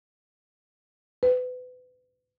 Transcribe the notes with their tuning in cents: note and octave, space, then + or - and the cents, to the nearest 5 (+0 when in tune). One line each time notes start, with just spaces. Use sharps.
B4 +30